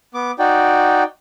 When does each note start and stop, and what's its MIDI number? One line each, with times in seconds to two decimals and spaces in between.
0.14 0.31 59
0.14 0.31 86
0.39 1.03 63
0.39 1.03 66
0.39 1.03 74
0.39 1.03 79